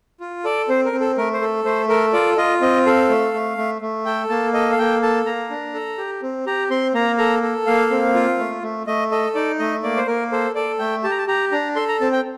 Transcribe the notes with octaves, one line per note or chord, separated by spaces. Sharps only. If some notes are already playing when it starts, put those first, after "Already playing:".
F4
A4 D5
C4 C5
A#4
C4
A4
A3 A#4
C5
A4
A3 C5
A4 A#4
F4 D5
F4 D#5
C4 D#5
A4 F5
A3
A3
A3
A3
A4 G5
A#3 A5
A4 D#5
F5
A#3 G5
A4 A5
A#3 A#5
D4
A4
G4
C4
G4 A#5
C4 C6
A#3 A#5
A4 A#5
A4
A#3 F5
C4
F4
A3
A3
A3 D#5
A4 D#5
D#4 D5
A3 D#5
A#3 D5
C5
A#3 A#4
A4 C5
A4 D5
A3 G5
G4 A5
A#5
A5
G4 A#5
D4 A#5
A4 C6
A#5
C4 A5
G5